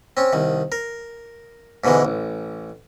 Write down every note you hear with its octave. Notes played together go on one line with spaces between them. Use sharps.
C4 C#4
C2 D#3
A#4
G#2 B2 D3 E3 G#3
A1